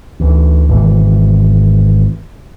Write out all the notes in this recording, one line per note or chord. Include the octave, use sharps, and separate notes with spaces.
D2 E3
G#1 B2 E3